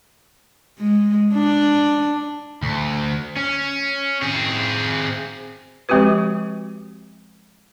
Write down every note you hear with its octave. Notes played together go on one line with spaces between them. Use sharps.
G#3
D4
D2
C#4
C4 G#4
F3 G#3 C4 F#4 G4 B4